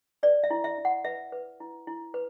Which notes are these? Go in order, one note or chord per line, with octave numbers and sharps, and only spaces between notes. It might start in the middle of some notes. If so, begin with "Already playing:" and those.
B4 D5
E5
E4
E5
E4
F#5
B4 E5
B4
E4
E4
B4